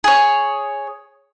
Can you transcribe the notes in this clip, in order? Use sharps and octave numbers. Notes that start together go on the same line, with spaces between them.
G#4 C#5